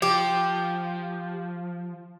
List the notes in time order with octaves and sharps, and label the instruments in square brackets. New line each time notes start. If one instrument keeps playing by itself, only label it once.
[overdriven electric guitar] F3 [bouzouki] G4